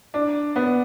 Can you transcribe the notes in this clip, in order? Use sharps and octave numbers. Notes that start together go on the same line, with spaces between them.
D4
B3